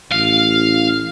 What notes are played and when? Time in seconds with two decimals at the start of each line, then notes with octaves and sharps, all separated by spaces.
0.12 A1 F5